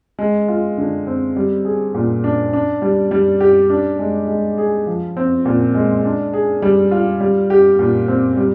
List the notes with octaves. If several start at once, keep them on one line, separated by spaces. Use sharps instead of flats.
G#3
F4
D3
C4
G3
G#4
A#2
D4
D4
G3
G3
G4
D4
G#3
G#3
G#4
F3
C4
A#2
G#3
D4
G#4
G3
F4
G3
G4
A#2
C4
G3